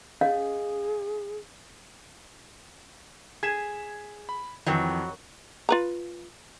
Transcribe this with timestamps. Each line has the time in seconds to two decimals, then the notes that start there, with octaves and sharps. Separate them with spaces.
0.21 C#4 G#4 D#5 F5
3.43 G#4 G#6 B6 E7
4.29 B5
4.66 F2 D#3 E3 F#3 C4
5.69 F4 B4 A#5